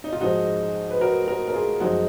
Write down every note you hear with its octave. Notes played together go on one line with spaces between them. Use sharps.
D#4
F4
G#2 F3 G#3 D#4 F#4
B4
F#4 A#4
F#4 A#4
A#4
F4 G#4
F#2 F3 G#3 D#4 F#4